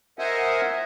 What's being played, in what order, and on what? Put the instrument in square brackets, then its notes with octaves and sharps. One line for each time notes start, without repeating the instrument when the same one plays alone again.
[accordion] A#4 C5 D#5 E5 F#5 G#5